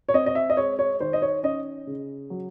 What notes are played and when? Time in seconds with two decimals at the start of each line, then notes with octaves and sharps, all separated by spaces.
0.09 C#5
0.14 C4 D#5
0.26 D#5
0.35 E5
0.50 D#5
0.57 G#3 C#5
0.79 C#5
1.00 D#3 C5
1.13 D#5
1.22 C#5
1.43 C#4 D#5
1.87 C#3
2.30 F#3